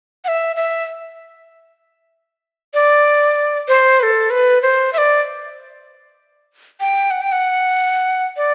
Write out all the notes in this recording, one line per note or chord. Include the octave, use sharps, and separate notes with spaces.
F#5
E5
E5
D5
C5
B4
A4
B4
C5
E5
D5
G5
F#5
G5
F#5
D5